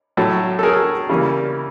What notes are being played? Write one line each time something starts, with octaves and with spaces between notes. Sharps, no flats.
A2 F#3 A3
A4
G#4 A#4
C#3 E3 G3 A#3